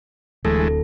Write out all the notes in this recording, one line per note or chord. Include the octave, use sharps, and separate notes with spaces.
D1 E3 G#3 A3 A4